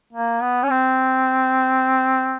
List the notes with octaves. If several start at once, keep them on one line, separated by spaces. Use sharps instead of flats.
A#3
B3
C#4
C4